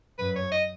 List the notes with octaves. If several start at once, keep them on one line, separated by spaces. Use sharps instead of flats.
F#2 B4
C#5
D#5